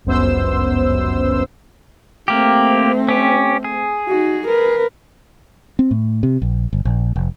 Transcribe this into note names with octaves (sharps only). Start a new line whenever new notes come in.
G1 C#2 F#2 B3 C5 E6
A3 A#3 C4 G4
C#4 G4
G#4
D#4 F#4
A#4 B4
C4
A2
C3
A#1
G1
A#1
F1